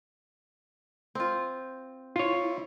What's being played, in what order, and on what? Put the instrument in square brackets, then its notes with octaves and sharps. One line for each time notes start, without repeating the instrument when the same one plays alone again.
[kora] C4 F4
[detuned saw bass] E4 [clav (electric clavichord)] F4 C#5